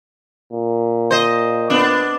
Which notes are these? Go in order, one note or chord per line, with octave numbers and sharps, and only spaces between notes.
A#2
C5 D#5
B3 D4